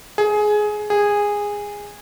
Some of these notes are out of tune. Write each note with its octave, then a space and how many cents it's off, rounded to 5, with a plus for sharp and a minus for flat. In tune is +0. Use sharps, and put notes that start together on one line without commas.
G#4 +15
G#4 -15